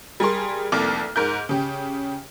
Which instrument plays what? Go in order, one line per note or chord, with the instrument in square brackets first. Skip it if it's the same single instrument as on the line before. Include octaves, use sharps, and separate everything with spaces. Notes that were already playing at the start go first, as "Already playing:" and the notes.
[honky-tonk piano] G3 G#4 A#4 C6
F1 C2 A#3 A4 D6 F6
G#2 A#4 G6
C#3 G4